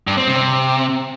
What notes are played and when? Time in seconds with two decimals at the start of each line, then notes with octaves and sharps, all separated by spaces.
0.07 G2
0.17 C4
0.28 C3